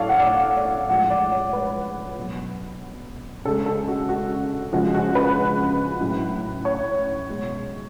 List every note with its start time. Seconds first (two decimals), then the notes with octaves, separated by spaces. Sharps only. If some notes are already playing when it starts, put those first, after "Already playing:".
Already playing: A2 F#3 A4 C#5 D5 F5
0.09 F#5
0.20 D5
0.25 F5
0.57 D5
0.89 A2 F3 G#3 F#5
1.10 D5
1.32 C#5
1.53 B4
2.17 B2 F#3
3.45 C#3 G#3 A4
3.66 A4
3.88 F#4
4.09 F#4
4.73 C#3 F3 G#3 F#4
4.94 F#4
5.15 B4
6.01 A2 F#3
6.65 C#5
7.29 B2 G#3